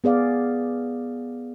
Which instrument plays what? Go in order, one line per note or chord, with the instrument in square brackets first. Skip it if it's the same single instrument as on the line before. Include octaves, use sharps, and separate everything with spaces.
[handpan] B3 G#4 D5 F5